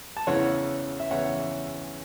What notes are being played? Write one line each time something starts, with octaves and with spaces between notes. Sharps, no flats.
A5
E2 C#3 E3 C#5 F#5
E5
E2 C#3 E3 C#5 F#5